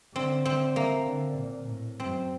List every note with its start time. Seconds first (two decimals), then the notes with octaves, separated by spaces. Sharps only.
0.15 D3 C4
0.45 C4
0.76 A#3
1.07 D3
1.37 A#2
1.69 A2
2.00 F#2 C4